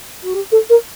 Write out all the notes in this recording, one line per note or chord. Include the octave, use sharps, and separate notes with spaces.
F#4
G4
A4
A#4